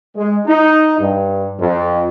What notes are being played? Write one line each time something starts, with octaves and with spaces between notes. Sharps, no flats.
G#3
D#4
G2
F2